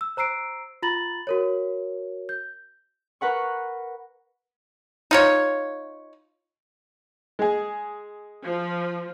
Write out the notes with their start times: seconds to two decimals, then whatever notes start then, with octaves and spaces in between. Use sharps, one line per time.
0.01 E6
0.17 C5 A#5 E6 C7 D7
0.82 F4 A#5 B5 A6 F#7
1.27 F#4 A#4 C#5
2.29 G6
3.21 A#4 B4 F#5 C#6
5.11 D#4 F4 C#5
7.39 G#3 G#4
8.46 F3